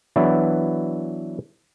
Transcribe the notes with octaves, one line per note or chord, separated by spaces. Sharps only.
E3 F#3 B3 D4 E4